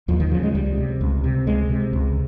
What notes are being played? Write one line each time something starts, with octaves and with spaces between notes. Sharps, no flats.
D#2 F3
D#3
C#3 F3
G#3
C#2 G3
C3
C#2
C3
C#2 G#3
C3
C#2